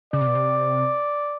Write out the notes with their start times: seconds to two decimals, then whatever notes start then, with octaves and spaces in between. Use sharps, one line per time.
0.13 C#3 D5
0.21 C3
0.27 B2
0.35 C3